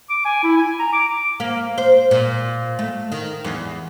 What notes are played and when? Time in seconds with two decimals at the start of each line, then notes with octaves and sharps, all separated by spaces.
0.10 D6
0.25 G#5
0.43 E4
0.57 G#5
0.79 A#5
0.93 D6
1.40 A#3
1.78 C5
2.11 A#2
2.79 A3
3.12 D#3
3.44 E2